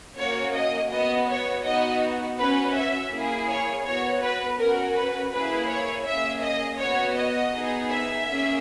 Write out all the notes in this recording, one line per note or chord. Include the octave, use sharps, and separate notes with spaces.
A#3 C#4 F#4 C#5
D#5
B3 F#4 D#5
C#5
B3 D#4 F#4 D#5
C#4 F#4 B4
E5
A#3 E4 G#4
C#5
B3 F#4 C#5
B4
C#4 F#4 A#4
B4
A#3 E4 G#4 B4
C#5
A#3 C#4 G#4 E5
D#5
B3 F#4 C#5
D#5
B3 D#4 G#4
E5
A#3 C#4 G#4